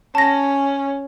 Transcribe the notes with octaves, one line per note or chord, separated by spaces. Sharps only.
C#4 A5 A#6